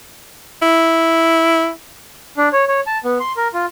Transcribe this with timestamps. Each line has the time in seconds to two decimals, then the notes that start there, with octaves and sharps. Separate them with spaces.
0.62 E4
2.37 D4
2.53 C#5
2.68 C#5
2.87 A5
3.04 B3
3.20 C6
3.37 A#4
3.54 F4